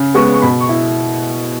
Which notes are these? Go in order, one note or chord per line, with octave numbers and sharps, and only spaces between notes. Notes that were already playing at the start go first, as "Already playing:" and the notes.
Already playing: C#3
G#3 B3 C#6
C#6
B2 B5
C#6
E4